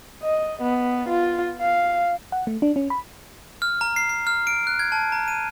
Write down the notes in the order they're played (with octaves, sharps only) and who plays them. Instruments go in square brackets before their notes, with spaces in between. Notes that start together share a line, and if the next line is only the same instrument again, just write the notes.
[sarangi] D#5
B3
F4
F5
[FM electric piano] F#5
A3
D4
C#4
B5
[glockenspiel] F6
A#5
C7
C7
F6
D7
F#6
G#6
A5
A#5
D#7